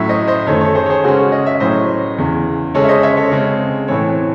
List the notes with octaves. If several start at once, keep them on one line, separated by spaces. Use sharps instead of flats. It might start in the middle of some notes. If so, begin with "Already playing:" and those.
Already playing: A2 F#3 C#4 C#5 E5
C5 D#5
C5 D#5
F#2 D#3 A3 A4 C#5
A4 C#5
G#4 C5
C#5
G#4 C5
C#3 G#3 C#4 F#4 A4
D#5
E5
A2 F#3 C#4 C5 D#5
E2 C#3 E3
C#3 G#3 C#4 A4 C#5
E5
C5 D#5
C#5 E5
A4 C#5
C#3 G#3 C4
A2 E3 C4 A4 C#5